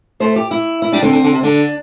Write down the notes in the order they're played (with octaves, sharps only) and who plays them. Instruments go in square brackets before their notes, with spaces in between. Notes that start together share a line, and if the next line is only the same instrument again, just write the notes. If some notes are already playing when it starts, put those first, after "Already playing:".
[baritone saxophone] A3 [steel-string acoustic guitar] C5
[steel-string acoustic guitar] G4
E4
E4
[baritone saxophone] G3 [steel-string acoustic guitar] D4
[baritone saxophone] D3 [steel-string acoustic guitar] C4
[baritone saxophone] D3
D3
C3
[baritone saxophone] D3 [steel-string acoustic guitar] D4